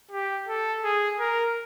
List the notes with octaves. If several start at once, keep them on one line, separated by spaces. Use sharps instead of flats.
G4
A4
G#4
A#4